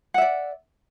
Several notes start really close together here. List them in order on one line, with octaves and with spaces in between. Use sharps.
F#5 E5 D5